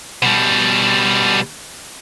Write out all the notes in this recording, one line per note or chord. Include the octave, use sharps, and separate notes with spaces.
B2 G3